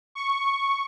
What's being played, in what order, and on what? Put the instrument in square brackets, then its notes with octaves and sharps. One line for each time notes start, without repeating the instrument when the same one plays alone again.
[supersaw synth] C#6